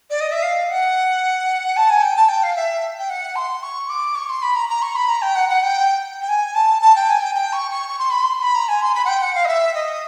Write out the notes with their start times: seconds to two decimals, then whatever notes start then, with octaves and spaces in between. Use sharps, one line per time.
0.10 D5
0.20 D#5
0.32 E5
0.42 F5
0.70 F#5
1.76 A5
1.90 G#5
2.02 G5
2.16 A5
2.28 G5
2.43 F5
2.56 E5
2.98 G5
3.09 F#5
3.35 C6
3.62 C#6
3.89 D6
4.15 C#6
4.29 C6
4.42 B5
4.55 A#5
4.69 A#5
4.82 C#6
4.95 B5
5.08 A#5
5.22 G5
5.35 F#5
5.49 F#5
5.63 G5
6.21 G5
6.29 G#5
6.55 A5
6.82 A5
6.95 G5
7.09 G#5
7.22 G5
7.35 G5
7.52 C#6
7.71 C#6
7.89 C#6
7.99 C6
8.10 B5
8.22 C6
8.41 B5
8.55 A#5
8.68 G#5
8.82 C6
8.95 B5
9.05 F#5
9.08 G5
9.22 F#5
9.34 F5
9.45 D#5
9.48 E5
9.74 D#5